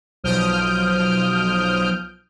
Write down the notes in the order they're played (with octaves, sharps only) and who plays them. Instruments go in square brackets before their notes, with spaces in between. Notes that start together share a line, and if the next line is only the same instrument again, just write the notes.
[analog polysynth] B1 F3 D#6 F6 G6 D7